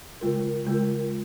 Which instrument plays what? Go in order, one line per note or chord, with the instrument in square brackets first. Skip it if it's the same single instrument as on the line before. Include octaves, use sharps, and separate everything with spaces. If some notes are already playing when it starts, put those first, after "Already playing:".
[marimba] C#3 G#3 F4 A#4
C#3 G#3 F4 A#4